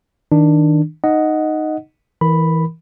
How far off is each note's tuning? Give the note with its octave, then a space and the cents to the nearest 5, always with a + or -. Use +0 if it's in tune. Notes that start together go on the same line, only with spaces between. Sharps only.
D#3 +20 D4 +15
D#4 -10 D#5 +0 F#5 +0
E3 -20 A#4 +0 B5 +0